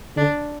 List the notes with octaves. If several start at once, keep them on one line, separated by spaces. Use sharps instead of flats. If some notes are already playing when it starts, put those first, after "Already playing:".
D3 D4